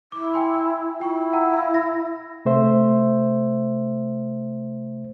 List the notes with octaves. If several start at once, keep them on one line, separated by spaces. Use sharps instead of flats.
E4 D6
G5 G#5 C6
E4 F4 G5 C#6
F#5 G5 A#5
F5
A#6
C3 A3 C5 E5